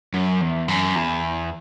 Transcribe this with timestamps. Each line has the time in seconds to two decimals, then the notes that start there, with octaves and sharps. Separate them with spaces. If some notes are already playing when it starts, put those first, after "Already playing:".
0.14 F#2
0.41 E2
0.68 F#2
0.95 E2